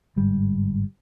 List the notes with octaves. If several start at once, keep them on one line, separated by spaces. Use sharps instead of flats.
G1 G#2 G3